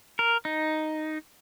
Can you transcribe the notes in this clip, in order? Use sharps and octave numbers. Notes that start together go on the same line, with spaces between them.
A#4
D#4